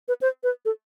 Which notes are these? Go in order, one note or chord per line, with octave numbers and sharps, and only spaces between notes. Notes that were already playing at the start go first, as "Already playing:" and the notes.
B4
C5
B4
A4